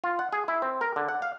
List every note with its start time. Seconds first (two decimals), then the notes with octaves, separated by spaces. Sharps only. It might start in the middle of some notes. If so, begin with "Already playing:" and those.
0.04 F4
0.19 F#5
0.32 G#4
0.48 E4
0.62 C4
0.81 A#4
0.96 D3
1.09 F#5
1.22 F5